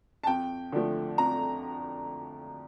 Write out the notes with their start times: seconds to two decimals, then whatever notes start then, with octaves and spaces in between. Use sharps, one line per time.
0.24 A5
0.27 F2 G5
0.72 D3 F3 A3
1.18 F2 A#5